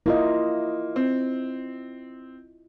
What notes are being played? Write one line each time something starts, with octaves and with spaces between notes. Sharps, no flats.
A#3 E4 F4 D#5
C4